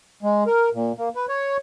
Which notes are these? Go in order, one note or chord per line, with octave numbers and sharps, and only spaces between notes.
G#3
A#4
A#2
A#3
B4
C#5